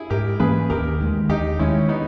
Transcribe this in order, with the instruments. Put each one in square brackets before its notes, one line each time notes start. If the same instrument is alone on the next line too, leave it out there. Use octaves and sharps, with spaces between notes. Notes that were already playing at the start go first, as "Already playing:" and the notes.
Already playing: [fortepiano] E4 G#4
[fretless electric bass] G#2 [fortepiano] G4 A#4
[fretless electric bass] E3 A#3 C#4 [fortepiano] G#4 B4
[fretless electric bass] D#2 [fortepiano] G4 A#4
[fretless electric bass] D#3 G#3
[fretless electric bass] D#2 [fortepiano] D#4 G4
[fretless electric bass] D#3 G#3 [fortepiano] C#4 E4
[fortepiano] B3 D#4